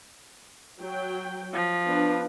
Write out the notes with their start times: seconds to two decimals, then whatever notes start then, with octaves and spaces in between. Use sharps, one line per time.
0.81 F#3 G5
1.53 F3
1.85 B3 D4 B4